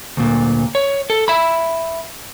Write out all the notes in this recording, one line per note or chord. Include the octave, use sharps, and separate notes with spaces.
D2 A#2
C#5
A4
E5 B5